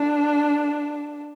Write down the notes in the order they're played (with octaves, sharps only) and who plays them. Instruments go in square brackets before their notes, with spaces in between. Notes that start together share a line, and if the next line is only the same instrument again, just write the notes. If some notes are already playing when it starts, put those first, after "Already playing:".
Already playing: [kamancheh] D4